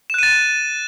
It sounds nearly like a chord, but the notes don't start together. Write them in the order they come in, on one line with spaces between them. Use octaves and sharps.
E7 F#6 D#7 A6